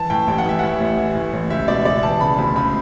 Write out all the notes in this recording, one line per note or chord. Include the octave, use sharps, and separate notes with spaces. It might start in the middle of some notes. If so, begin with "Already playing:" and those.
Already playing: E3 A5
A2 G5
A1 G5
F#5
E3 E5
A2 F#5
A1
E3
A2
A1
C#2 E5
B2 D5
B2 D5
E3 A5
C#3 B5
D2 B5
C#2 B5